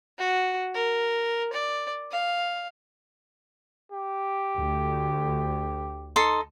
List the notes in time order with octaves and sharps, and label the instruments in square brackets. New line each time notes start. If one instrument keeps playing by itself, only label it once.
[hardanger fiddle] F#4
A#4
D5
F5
[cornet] G4
[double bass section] D2
[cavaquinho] D#4 A4 C6